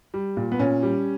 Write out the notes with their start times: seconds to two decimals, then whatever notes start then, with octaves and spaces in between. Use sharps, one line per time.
0.14 G3
0.37 A#2
0.52 B3
0.59 A#2 C#4
0.83 G3